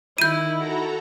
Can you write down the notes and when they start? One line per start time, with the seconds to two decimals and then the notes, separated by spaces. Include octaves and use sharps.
0.18 D#3 E4 G6 D#7
0.56 F#4 A4 A#5